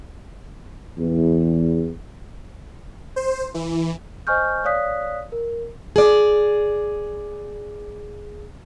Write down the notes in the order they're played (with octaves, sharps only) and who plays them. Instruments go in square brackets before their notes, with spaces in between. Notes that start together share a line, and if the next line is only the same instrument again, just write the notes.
[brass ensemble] E2
[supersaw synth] C5
E3
[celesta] C5 D#5 G#5 C#6 F6 G6
C#5 D5 F5 D#6 F#6 B6
A#4
[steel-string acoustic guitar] G#4 D5